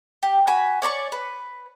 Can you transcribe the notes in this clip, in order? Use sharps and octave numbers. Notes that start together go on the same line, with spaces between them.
G4
F#4 G#5 B5
C#5 D5 B5 C#6
B4